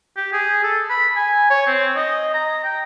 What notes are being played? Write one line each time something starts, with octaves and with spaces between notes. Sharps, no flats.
G4
G#4
A4
B5
G#5
C#5
C4
D#5
A#5
G5